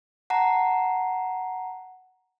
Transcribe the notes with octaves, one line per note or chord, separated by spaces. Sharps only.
F#5 A5 A#5